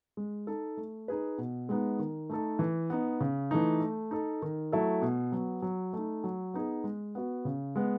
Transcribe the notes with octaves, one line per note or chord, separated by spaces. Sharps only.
G#3
D#4 A4
A3
D#4 G#4 B4
B2
G#3 B3 D#4
D#3
A3 D#4 A4
E3
B3 D#4
C#3
E3 A3 D#4
A3
D#4 A4
D#3
F#3 A3 E4 A4
B2
F#3 B3
F#3
A3 D#4
F#3
B3 D#4 G#4
G#3
B3 F#4
C#3
G#3 B3